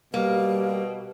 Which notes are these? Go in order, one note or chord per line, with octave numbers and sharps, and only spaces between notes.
B2 G3 A#3